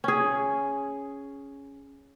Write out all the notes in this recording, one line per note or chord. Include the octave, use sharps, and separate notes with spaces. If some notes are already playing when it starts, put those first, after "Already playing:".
C#4 G#4